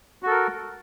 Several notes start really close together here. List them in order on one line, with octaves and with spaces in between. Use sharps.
F#4 A4 A#4